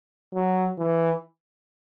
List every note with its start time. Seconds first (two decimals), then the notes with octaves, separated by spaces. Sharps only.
0.34 F#3
0.79 E3